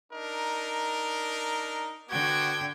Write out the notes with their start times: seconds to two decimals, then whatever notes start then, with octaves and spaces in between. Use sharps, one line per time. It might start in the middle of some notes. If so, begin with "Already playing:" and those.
0.12 D4 D#4 A#4
2.09 D3 B3 F#4 G5 G#6